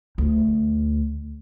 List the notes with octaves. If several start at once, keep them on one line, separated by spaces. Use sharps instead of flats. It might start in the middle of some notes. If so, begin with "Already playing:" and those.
D2